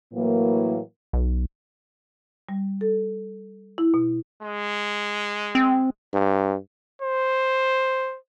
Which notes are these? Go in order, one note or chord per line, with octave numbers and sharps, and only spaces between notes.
A2 E3 F#3 A#3
B1
G3
A4
E4
B2
G#3
C4
G2
C5